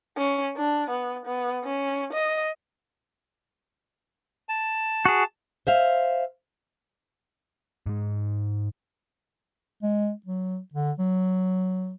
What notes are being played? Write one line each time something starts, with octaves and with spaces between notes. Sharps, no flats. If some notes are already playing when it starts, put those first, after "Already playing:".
C#4
D4
B3
B3
C#4
D#5
A5
F#4 G#4
C5 E5 F5
G#2 G#3
G#3
F#3
D3
F#3